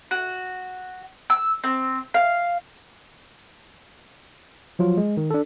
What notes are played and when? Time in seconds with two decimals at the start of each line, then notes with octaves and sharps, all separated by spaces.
0.11 F#4
1.30 E6
1.64 C4
2.14 F5
4.79 F3 F#3 F4
4.97 G#3
5.17 D#3
5.31 D4 A4